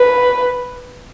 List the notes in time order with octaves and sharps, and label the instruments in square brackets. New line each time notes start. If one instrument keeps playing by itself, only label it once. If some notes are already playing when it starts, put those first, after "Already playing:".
Already playing: [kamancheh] B4